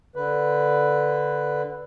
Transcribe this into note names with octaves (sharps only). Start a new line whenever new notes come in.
D3 B4